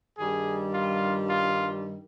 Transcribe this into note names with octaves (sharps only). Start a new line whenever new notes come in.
G2 D#3 G3 G#4
F4
F4